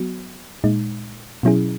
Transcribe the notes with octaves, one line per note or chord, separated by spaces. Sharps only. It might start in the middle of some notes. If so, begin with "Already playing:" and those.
Already playing: F#3 B3 F#4
A#2 G#3 D#4
B2 F#3 C#4 E4 G#4